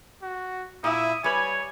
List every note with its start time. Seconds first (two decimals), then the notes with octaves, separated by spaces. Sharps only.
0.22 F#4
0.84 A#2 E4 E5 D#6
1.24 G3 B4 C#5 G#5